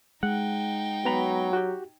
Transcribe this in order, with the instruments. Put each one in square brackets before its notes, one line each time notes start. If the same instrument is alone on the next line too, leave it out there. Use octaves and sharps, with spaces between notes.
[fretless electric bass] G#3 [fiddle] D#4 G5 [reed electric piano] F#5
[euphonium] F#3 [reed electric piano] B3 A#5 B5
[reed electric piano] F#4 G4